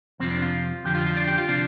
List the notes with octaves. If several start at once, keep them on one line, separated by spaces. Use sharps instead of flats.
F2 C3 F3 C4
D4
F4
F2 D3 F3 G4
F4
F4
D4
G4
F4
C3 F3 D4